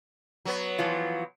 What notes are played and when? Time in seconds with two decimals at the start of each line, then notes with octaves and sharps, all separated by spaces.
0.45 F#3 B3
0.79 E3 F3 F4